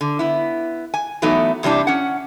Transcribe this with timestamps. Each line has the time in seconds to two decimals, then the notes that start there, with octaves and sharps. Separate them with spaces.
0.01 D3
0.19 B3 E4
0.94 G#5
1.22 E3 F#3 A3 B3 D#4
1.63 E2 C3 G3 D4 E4
1.87 C#4 F#5